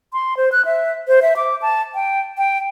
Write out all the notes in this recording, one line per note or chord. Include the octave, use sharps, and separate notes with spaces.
C6
C5
F#6
E5
C5
E5
D6
A5
G5
G5